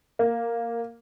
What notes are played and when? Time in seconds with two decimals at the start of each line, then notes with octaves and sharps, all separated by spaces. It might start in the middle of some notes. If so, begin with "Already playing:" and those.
0.19 A#3